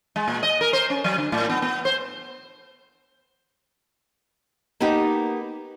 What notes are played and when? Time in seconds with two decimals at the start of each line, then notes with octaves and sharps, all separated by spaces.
0.16 G#3
0.28 A#2
0.43 D#5
0.61 A#4
0.73 C5
0.90 C#4
1.04 F#3
1.18 D3
1.32 A2
1.49 B3
1.62 B3
1.85 C5
4.80 A#3 B3 D#4 G4